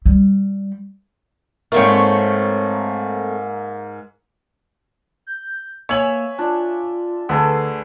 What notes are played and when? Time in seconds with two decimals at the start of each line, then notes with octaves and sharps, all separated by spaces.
0.06 G3
1.72 G#2 A3 A#3 C4 C#5
5.27 G6
5.89 A#3 C#5 E5 G#5 F#7
6.39 D4 F4
7.29 D2 D3 G#4 A4 B4